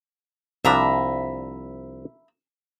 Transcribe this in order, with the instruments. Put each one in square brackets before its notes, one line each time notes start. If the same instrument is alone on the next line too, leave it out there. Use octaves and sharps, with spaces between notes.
[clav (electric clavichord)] C2 F3 D4 [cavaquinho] E5 A#5 B5